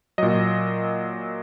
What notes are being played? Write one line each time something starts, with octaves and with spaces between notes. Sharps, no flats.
A#2 F#3 D#5